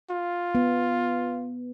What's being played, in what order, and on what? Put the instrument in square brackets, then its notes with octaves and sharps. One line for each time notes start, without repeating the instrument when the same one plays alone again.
[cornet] F4
[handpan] B3